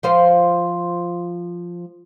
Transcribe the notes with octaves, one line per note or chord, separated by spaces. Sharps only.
F3 F4 C5